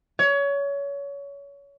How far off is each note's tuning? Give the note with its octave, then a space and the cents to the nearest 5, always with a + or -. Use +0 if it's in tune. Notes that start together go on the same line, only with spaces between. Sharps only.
C#5 +25